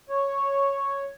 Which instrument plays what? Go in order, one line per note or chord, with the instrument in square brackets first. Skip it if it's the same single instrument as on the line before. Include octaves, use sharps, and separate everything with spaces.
[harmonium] C#5